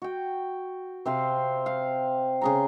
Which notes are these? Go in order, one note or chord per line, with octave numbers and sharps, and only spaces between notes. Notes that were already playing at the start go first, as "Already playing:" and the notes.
F#4 G5
C3 C4 C5 F5
F5
C#3 G#4 A#5